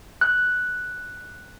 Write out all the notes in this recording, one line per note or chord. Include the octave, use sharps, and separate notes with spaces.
F#6